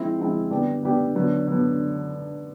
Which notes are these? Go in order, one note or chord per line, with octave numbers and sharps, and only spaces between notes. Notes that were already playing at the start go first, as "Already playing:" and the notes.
Already playing: F3 G#3 C4 E4
F3 G#3 C4 E4
D3 G3 B3 D4 G4
D3 G3 B3 D4 G4
D3 F#3 B3
D3 F#3 B3